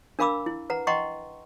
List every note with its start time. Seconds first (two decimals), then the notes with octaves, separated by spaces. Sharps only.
0.19 D4 A#4 F5 B5 D6 E6
0.46 E4
0.70 B4 F#5 A#5
0.87 D#5 F#5 G5 A#5 C6 C#6